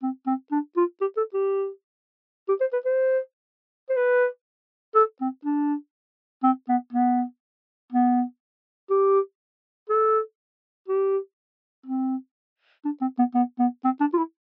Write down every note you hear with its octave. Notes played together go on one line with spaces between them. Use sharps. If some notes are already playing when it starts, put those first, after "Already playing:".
C4
C4
D4
F4
G4
A4
G4
G4
C5
B4
C5
C5
B4
A4
C4
D4
C4
B3
B3
B3
G4
A4
G4
C4
D4
C4
B3
B3
B3
C4
D4
F4
E4